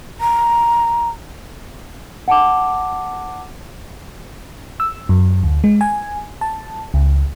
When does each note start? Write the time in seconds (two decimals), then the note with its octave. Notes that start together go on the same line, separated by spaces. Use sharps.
0.20 A#5
2.28 F#5 A5 D6
4.80 E6
5.09 F#2
5.43 D2
5.64 G#3
5.81 G#5
6.41 A5
6.94 C#2